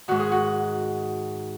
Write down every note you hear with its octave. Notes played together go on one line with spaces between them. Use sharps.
G#2 D#3 F#4
G#4
F#4